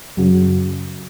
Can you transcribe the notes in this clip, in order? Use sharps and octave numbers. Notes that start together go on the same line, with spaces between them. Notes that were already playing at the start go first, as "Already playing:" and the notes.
F#2 C#3 F#3